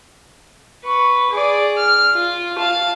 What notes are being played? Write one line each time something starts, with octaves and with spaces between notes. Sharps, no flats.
B4 C#6
G#4 D5
F6
F4
F5 A5